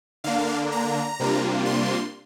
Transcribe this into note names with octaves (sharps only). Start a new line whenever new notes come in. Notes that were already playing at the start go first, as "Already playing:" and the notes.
D3 A#3 D4 F5
A#5
C3 G3 A#3 D4 F4
C6